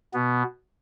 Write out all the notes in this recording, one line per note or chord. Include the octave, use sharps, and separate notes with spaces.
B2 B3